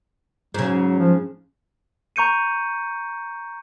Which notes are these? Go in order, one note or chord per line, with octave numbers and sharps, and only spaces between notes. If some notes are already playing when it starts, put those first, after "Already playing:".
G#2 C#3 F#3
F3
A#5 C#6 G6 C#7 D#7